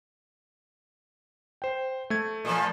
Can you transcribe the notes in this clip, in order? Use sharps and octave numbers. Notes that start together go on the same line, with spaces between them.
C5 G5
A3 G#6
A#2 F3